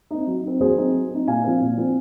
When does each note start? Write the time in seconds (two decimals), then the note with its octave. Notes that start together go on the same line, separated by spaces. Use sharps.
0.11 C4 D#4
0.27 F#3
0.44 C4 D#4
0.61 F#3 G#4 C5
0.77 C4 D#4
0.94 F#3
1.11 C4 D#4
1.27 A#2 F5 G#5
1.44 F3 C4
1.61 A#2
1.77 F3 C4